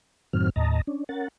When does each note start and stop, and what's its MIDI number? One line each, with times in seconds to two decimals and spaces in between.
0.33 0.50 42
0.33 0.50 45
0.33 0.50 51
0.33 0.50 54
0.33 0.50 60
0.33 0.50 89
0.56 0.81 39
0.56 0.81 45
0.56 0.81 75
0.56 0.81 81
0.56 0.81 82
0.87 1.04 61
0.87 1.04 62
1.09 1.28 61
1.09 1.28 70
1.09 1.28 78
1.09 1.28 93